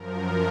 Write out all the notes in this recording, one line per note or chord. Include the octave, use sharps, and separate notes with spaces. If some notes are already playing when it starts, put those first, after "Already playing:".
Already playing: F#2 F3 A#4